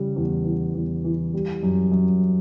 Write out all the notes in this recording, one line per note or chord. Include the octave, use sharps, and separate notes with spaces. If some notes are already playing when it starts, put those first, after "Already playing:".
Already playing: C#3 E3 G3
E2
E3
E2
E3
G3
F#2
F#2